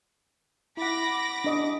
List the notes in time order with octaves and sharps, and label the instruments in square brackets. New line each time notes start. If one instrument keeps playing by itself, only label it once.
[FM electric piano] E4 F#5 [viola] B5 [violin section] D6 A#6
[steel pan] D4 D#5